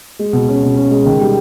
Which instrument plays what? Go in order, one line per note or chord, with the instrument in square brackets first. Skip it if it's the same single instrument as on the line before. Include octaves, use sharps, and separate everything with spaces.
[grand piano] G#3
B2
C#4
B2
C#4
G#3
D#3
G3